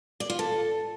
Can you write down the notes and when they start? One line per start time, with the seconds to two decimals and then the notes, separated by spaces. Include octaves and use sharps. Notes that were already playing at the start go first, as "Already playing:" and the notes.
0.20 D5
0.30 F4
0.39 A4